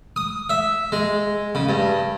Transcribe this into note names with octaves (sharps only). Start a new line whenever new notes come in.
D#6
E5
G#3
C#3
G2